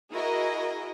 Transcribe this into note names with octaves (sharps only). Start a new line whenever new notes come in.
E4 F#4 G#4 A#4 D#5